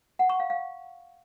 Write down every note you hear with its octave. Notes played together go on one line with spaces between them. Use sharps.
F#5
C#6
F5
F5